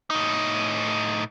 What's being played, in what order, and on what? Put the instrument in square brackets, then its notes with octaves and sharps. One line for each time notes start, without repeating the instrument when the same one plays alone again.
[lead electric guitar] A2 D#4